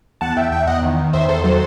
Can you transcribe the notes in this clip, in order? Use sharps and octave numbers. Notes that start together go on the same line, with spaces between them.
E2 F#5 A5
E2 E5 G5
E2 E5 G5
E2 D#5 F#5
D#3
D#3
E2 C5 E5
D#3 A4 C5
F#3 A4 C5